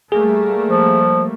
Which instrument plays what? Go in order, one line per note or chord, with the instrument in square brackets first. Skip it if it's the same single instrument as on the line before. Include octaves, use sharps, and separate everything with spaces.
[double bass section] G3 A3 A#3 [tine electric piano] G#4
[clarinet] F3